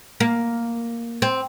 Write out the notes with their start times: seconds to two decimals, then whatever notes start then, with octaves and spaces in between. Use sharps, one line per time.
0.20 A#3
1.22 C4